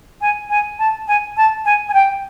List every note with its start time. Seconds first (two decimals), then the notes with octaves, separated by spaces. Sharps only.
0.21 G#5
0.49 G#5
0.78 A5
1.07 G#5
1.36 A5
1.65 G#5
1.88 G#5
1.93 G5